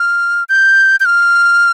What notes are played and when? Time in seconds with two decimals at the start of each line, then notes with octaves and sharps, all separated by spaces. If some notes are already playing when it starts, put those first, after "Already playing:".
Already playing: F6
0.49 G6
1.00 G6
1.05 F6